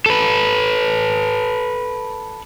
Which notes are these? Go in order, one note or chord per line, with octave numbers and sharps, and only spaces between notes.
A4 B4